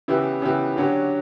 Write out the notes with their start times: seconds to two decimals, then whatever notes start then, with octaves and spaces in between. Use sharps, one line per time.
0.08 C#3 E3 B3 E4 G4
0.42 C#3 E3 B3 E4 G4
0.76 D3 F#3 C#4 G4